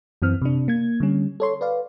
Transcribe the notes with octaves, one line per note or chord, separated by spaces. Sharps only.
F#2 E3 C4 F6
C3 D4
A#3 G#6
D3 G3 C#4
A4 C#5 C6
B4 D5 F5